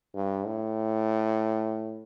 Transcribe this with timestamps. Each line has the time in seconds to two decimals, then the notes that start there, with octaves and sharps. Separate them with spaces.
0.15 G2
0.46 A2